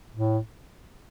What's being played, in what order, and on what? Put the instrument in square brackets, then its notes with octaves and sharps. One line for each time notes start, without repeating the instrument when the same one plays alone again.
[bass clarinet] A2